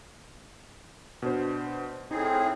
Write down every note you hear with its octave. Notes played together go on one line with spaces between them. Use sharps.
B2 D4 C5
A2 C4 D#4 G#4